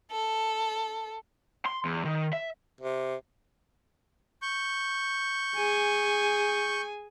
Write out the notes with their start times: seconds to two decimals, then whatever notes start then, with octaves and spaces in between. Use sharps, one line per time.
0.11 A4
1.66 C6
1.85 E2
2.05 D#3
2.33 E5
2.81 C3
4.42 C#6 G6
5.56 G#4 G#5